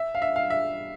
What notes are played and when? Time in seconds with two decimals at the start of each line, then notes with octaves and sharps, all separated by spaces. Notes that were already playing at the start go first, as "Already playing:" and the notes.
Already playing: E5
0.15 F5
0.22 E5
0.36 F5
0.50 E5